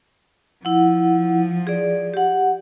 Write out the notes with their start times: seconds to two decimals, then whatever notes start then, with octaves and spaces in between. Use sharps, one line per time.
0.65 F3 E4 F#5
1.67 G#4 D5
2.14 G4 F#5